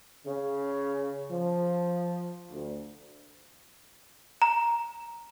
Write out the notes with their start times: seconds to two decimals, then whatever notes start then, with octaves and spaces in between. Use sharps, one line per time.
0.26 C#3
1.30 F3
2.51 D2
4.42 A#5